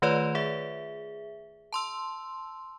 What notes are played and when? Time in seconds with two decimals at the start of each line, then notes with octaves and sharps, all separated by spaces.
0.02 D#3 A3 F4 B4 C#5 D5
0.35 G#4 E5
1.73 A5 C6 E6